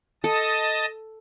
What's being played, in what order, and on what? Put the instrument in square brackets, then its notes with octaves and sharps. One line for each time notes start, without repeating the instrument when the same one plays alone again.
[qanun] A4 [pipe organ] D#5 A5 D#6